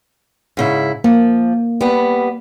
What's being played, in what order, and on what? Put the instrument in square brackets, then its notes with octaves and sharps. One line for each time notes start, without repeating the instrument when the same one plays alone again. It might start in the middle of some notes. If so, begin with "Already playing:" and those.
[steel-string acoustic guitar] G#2 C#3 E4
[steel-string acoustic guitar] F3 [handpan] A#3
[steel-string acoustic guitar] G3 B3